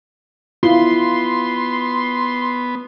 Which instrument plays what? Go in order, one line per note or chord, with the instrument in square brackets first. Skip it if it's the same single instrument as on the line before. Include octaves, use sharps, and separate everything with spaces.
[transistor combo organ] B3 [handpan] E4 F4 [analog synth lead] C6